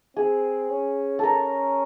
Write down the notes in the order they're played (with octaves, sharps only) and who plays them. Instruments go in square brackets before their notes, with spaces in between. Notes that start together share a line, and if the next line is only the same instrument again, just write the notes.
[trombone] C4 [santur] G#4
[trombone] C#4
[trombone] C#4 [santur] A4 A#4